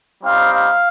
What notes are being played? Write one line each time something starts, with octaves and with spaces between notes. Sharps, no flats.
G3 C4 D#4 F5
F5